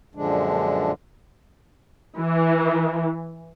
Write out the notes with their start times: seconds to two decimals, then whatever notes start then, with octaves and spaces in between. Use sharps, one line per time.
0.15 F#2 A#2 D3 F3 G#3 D4
2.19 E3